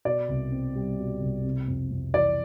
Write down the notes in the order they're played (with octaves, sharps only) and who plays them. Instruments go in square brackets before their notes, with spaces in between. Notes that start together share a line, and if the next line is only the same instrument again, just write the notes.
[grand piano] B2 [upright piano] D5
[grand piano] C2
C4
G3
B2
C2
C3
F2
F2
[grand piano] E3 [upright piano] D5